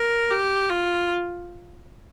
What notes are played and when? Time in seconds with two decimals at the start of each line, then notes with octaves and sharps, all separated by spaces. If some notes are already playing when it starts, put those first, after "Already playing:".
Already playing: A#4
0.31 G4
0.69 F4